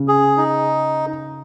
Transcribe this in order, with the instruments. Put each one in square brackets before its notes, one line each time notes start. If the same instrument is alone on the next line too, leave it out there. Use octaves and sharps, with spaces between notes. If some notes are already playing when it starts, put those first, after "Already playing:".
Already playing: [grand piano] C#3
[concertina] G#4
D#4